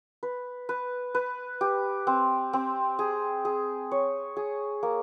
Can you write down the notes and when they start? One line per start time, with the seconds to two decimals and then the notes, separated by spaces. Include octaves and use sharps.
0.23 B4
0.69 B4
1.15 B4
1.61 G4
2.07 C4
2.53 C4
2.99 G#4
3.45 G#4
3.92 C#5
4.37 G#4
4.83 A#3